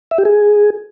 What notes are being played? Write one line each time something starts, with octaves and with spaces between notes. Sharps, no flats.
E5
G4
G#4